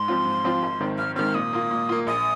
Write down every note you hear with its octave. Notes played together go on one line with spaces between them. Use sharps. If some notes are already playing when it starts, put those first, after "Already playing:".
Already playing: G#2 C6
F3 C4 F4
G#2
F3 C4 F4
G#1
G#2 D#3 C4
G#1 F6
G#2 D#3 C4 F6
A#2 D#6
A#3 F4
A#2
A#3 F4
A#1 D#6